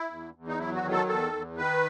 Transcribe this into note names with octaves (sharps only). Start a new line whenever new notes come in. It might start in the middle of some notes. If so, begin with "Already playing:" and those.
Already playing: E4
E2
E2
D#4
F#3 E4
F#4
D#3
A4
E2 A4
E2
D#3 B4